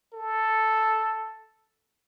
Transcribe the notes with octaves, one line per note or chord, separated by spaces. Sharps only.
A4